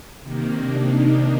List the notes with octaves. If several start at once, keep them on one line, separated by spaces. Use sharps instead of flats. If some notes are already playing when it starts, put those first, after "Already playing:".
C3 D#3 A#3
D4
D#4